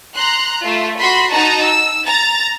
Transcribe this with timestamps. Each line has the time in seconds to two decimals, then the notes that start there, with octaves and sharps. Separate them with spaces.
0.15 A#5 C6 F#6
0.64 A3 F4
1.00 F#4 B5 C6
1.33 D#4 F#4 D#5 A5 A#5
1.67 E6
2.06 A#5 A6